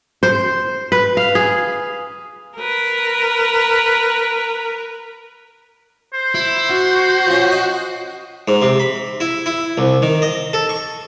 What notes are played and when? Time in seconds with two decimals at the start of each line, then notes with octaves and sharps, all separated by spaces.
0.23 C5
0.92 B4
1.17 F5
1.35 G#4
2.57 A#4 B4
6.13 C5
6.35 E4
6.70 F#4
7.27 F3 C#4
7.51 D#5
8.48 G#2
8.62 C3
8.80 B5
9.20 E4
9.46 E4
9.78 C2
10.02 D#3
10.22 D#5
10.53 A4
10.69 C#6